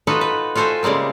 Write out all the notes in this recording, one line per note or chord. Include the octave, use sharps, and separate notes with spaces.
D#4 F4 F#4 A4 B4 D#5
B4
F4 F#4 A4 C5 E5 G#5
C#3 G3 G#3 A#3 C4